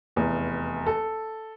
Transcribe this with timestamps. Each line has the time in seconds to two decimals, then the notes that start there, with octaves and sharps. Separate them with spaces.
0.16 F1 E2
0.86 A4